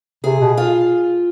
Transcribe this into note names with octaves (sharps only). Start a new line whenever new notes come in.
C3 G#4
B2
F4